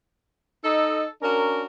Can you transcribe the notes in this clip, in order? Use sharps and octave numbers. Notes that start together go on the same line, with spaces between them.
D#4 A4 D#5
C#4 D4 F#4 A#4